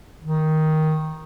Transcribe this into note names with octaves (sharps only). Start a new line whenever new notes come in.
D#3